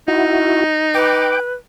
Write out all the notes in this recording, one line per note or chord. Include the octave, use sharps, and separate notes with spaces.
D#4 E4 F#4
B4 G5 D6